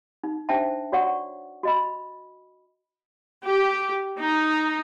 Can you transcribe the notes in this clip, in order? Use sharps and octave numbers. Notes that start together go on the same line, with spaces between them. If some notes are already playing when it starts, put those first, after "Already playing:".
D#4
D4 C5 E5 G5 A5
F#4 C#5 D5 F#5 C#6
F#4 D#5 B5
G4
D#4